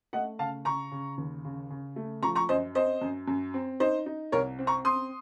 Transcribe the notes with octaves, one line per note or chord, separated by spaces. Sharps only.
A3 D#5 F#5
C#3 F5 A5
C#3 A#5 C#6
C#3
D#2
C#3
C#3
A3
F3 A#5 C#6
A#5 C#6
F#2 C5 D#5
C4 C5 D#5
F#2
F#2
C4
D#4 C5 D#5
D#4
C2 A#4 C#5
C4
A#5 C#6
C4 C6 D#6